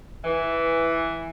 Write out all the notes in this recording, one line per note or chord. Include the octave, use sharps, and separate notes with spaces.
E3